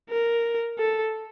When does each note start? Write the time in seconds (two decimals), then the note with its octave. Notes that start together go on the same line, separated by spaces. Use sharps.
0.10 A#4
0.78 A4